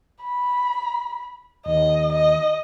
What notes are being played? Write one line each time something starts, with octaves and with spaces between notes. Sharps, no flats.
B5
D#2 D#5
D#5